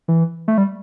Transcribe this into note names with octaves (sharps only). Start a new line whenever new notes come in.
E3
A3
G3